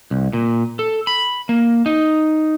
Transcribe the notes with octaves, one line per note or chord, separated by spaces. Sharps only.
C2
A#2
A4
B5
A#3
D#4